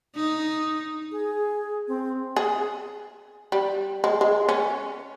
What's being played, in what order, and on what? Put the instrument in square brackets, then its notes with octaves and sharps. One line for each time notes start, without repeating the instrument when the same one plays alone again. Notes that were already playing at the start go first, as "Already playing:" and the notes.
[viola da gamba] D#4
[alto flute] G#4
C4
[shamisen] G#4
G3
G#3
G#3
C#4